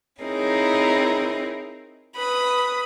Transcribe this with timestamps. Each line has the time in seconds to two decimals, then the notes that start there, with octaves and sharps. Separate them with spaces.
0.22 C4 D#4 E4 G#4 A#4 C#5
2.17 B4 B5 D#6